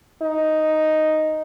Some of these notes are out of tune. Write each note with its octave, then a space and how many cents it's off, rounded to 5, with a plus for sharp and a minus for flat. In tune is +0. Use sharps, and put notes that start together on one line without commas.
D#4 +0